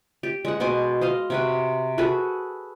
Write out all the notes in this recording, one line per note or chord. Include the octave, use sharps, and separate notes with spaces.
G4
G#3 F#5
B2 C5 G#5 D6
C5 D#5 F5
C3 F#4 B4
F#4 G#4 A4 B4